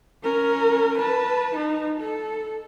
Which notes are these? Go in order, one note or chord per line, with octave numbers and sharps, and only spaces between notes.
C#4 A#4
B4 A5
D#4
A4